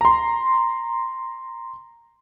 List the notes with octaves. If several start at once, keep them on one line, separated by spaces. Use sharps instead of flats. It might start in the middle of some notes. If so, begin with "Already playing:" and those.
A#5 C6